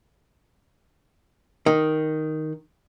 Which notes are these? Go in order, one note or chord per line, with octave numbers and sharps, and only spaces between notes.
D#3